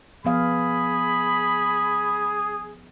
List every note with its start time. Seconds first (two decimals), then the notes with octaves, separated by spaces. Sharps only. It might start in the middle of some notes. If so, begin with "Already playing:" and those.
0.25 F3 B3 G#4 F5 B5